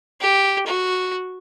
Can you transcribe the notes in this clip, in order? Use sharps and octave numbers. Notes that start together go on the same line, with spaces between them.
G4
F#4